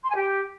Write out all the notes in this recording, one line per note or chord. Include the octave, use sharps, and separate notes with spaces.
C6
G#5
G4